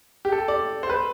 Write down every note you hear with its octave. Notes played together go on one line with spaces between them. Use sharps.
G4
A4
D5
C5
B4